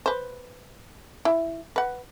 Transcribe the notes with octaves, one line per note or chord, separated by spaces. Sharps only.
B4 C5
E4
B4 F#5